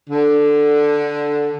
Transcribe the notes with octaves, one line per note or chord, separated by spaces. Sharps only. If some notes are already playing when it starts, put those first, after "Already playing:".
D3